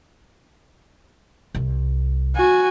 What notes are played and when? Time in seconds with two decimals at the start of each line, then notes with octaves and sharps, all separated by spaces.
1.55 C2
2.35 F#4 G#5